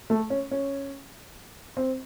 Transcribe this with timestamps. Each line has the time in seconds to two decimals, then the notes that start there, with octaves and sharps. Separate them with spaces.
0.10 A3
0.30 C#4
0.51 C#4
1.77 C4